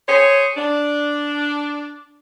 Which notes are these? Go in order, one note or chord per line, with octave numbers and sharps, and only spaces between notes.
G#4 C5 C#5
D4